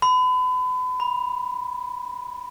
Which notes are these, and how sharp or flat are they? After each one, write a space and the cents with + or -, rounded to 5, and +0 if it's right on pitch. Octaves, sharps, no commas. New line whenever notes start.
B5 +35
B5 -20